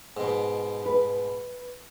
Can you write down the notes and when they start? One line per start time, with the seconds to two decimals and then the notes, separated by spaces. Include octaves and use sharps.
0.17 G#2 B2
0.86 B4